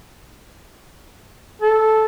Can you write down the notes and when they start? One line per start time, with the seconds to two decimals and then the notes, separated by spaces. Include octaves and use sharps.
1.62 A4